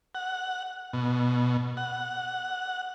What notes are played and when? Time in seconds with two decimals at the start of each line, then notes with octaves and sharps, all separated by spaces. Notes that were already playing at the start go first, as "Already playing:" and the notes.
0.15 F#5
0.93 B2
1.77 F#5